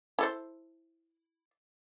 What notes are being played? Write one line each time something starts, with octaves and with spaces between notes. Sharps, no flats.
E4 A4 C5